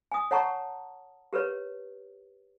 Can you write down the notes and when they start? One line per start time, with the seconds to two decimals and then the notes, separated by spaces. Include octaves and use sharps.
0.12 G#5 D#6
0.31 C#5 F#5 A5 A#5 C#6
1.33 G4 A#4 B4 C#5